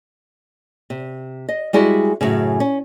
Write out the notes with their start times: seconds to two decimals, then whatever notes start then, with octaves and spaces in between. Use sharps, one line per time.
0.90 C3
1.49 D#5
1.73 G3 G#3 E4 F#4 G#4
2.21 F#2 A2 C#3
2.60 C#4